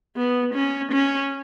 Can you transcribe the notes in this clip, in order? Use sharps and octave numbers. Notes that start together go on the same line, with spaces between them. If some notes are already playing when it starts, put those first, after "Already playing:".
B3
C#4
C#4